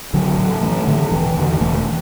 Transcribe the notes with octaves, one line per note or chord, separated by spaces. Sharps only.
A1 D3 F#3
A2
A1 E3 A3
A2 D3
E1 E3
E2 D3
E1 E3 A3